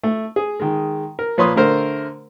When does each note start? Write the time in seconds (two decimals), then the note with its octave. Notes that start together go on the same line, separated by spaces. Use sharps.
0.03 A3
0.36 G#4
0.60 D#3 G#3
1.19 A#4
1.38 A#2 F3 B4 C#5 C6 D#6
1.56 D3 A3 A#4 C5